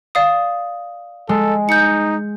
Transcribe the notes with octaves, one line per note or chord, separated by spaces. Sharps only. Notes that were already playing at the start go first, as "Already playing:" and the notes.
D5 F5 D#6
G#3 A4
D#4 G6 C#7